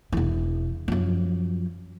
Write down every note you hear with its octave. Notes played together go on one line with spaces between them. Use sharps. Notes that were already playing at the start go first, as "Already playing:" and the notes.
E1 E3
F#2 F3